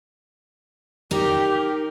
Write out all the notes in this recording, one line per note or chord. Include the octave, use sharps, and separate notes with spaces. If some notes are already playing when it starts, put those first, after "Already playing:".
D#4 G4 A#4